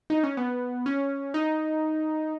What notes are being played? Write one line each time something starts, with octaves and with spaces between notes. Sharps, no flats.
D#4
C#4
B3
C#4
D#4